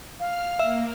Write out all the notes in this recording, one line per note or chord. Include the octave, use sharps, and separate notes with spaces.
F5 F6
A#3 E5